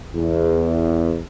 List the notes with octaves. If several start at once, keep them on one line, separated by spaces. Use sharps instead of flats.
E2